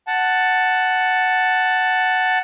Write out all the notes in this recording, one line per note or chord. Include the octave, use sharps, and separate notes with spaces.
F#5 A5